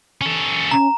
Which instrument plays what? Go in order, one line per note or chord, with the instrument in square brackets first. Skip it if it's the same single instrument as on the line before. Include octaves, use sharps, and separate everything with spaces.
[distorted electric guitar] C#4 A4
[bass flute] C#4 [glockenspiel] A#5